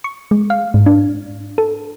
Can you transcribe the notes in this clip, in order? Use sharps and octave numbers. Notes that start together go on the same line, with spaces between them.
C#6
G#3
F5
G#2
D4
A4